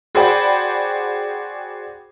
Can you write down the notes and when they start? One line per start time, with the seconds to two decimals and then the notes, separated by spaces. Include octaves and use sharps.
0.15 F#4 G#4 C5 D5 G5 B5